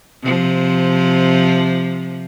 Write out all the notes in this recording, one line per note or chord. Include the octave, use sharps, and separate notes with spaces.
C3 F3